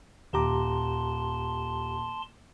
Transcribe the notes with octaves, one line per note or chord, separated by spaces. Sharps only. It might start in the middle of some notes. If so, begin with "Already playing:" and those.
D#1 D#2 G4 A5 A#5 C6 D6